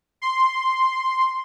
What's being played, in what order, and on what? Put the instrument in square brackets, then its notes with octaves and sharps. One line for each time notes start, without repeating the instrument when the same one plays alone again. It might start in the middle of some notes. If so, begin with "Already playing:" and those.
[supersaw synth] C6